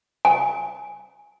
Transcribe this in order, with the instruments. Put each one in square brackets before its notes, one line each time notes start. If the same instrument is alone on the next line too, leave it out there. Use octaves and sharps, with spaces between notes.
[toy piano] G#5